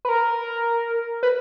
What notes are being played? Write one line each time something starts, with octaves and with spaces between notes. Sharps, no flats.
B4
A#4
B4